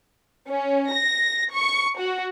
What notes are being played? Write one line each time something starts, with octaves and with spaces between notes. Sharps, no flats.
C#4
A#6
C#6
F#4